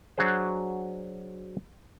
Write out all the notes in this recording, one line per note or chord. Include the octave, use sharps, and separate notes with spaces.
F#3 D4 F#4 G#4 C5